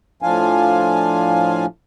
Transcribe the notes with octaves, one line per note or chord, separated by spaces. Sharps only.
A2 F3 D4 F4 F5 G#5